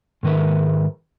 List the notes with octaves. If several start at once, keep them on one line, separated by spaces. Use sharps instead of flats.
G#2 D#3 B4 E5